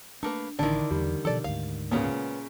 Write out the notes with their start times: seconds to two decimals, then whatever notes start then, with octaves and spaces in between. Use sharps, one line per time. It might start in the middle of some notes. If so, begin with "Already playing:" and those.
0.23 A3 A#3 D4 B4
0.59 A1 D3 D#3 D4 E4
0.91 E2 G3
1.25 B2 F3 A4 D5
1.44 D2 G#2 F5
1.91 A#2 C#3 G#3 B3 C#4